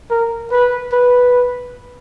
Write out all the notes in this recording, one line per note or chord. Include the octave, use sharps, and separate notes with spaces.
A#4
B4
B4